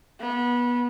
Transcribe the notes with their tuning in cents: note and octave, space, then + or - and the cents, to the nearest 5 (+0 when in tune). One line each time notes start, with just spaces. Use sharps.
B3 -25